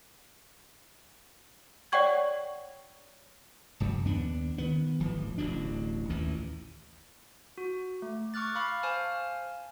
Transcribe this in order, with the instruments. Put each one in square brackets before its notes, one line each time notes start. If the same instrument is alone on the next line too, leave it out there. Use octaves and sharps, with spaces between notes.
[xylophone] C#5 D5 F#5 G5 C#6 G#6
[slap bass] F1 F#2 F3
D#2 B3 D4
D#3 B3
D1 G#1 E3 F3
D1 A1 B2 D4
A1 D#2 A#2 E3
[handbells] F#4
A3
C#6 D6 F6 F#6 A6
F5 B5 C#6 F6
C5 F5 G#5 A5 F6